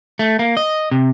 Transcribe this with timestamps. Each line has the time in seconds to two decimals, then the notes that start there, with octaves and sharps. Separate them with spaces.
0.19 A3
0.39 A#3
0.57 D#5
0.91 C3